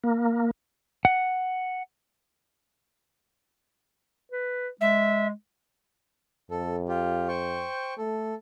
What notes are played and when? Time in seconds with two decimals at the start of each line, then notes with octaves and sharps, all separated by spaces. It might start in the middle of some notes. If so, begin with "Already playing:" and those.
0.04 A#3
1.05 F#5
4.32 B4
4.81 G#3 E5
6.51 F2 A4
6.88 F4 G4
7.28 C5 G5 C#6
7.98 A3 A4